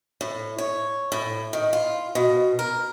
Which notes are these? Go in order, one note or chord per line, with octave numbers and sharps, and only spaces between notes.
A2
C#5
A2
D#3
F4
B2
A#4